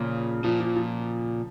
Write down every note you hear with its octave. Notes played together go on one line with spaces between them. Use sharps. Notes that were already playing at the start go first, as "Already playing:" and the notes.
Already playing: A#2 C#3 F3
A#2 F3
F3
F3